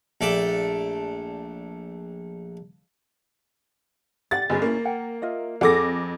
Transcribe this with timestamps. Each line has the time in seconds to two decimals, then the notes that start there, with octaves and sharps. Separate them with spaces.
0.21 A#1 A3 A4 D5
4.31 G4 D5 F#5 A6
4.50 G1 C#4 D4 G#4 D#5
4.62 A#3 C#4 E4
4.85 F#5 G5
5.22 F4 D#5 E5
5.61 F2 G#4 A4 F#5 D6 A#6